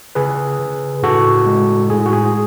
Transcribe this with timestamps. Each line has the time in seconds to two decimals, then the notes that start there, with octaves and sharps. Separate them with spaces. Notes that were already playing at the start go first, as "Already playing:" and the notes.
0.15 C#3 G#4 B4
0.59 C#3
1.03 A2 F#4 A4
1.46 G#3
1.90 A2 G#4
2.06 F#4
2.13 G#4